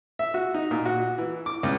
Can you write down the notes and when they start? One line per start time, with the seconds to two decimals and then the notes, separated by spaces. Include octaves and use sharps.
0.19 E5
0.34 F#4
0.54 D#4
0.71 A#2
0.86 F#4
1.18 E3
1.46 D6
1.63 C#2